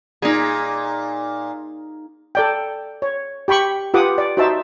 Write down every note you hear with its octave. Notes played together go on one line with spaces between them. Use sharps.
A#2 D#4 G#4
A4 D5 G5
C#5
G4 G5 B5 C#6
F4 G4 B4 F#5 D6 D#6
D5
D#4 F#4 C5 E5 A5